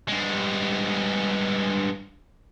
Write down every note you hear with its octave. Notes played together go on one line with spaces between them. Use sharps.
G2 G#3